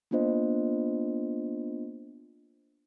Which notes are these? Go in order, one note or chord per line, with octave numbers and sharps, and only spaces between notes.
A#3 B3 D4 F4 C5 D#5